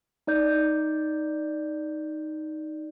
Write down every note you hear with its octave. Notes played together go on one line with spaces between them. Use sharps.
D#4 D5 G6